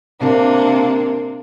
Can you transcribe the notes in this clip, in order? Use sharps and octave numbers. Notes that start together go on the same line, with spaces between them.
C3 A#3 D4